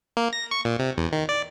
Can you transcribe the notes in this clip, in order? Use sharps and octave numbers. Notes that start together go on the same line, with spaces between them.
A#3
A#6
C#6
A#2
C3
E2
D#3
D5